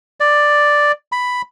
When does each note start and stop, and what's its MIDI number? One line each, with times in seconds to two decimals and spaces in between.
0.20 0.92 74
1.12 1.42 83